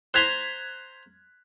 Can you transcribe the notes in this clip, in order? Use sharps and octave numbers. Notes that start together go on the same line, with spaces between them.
C5 A#5 C6 F#6 G#6 B6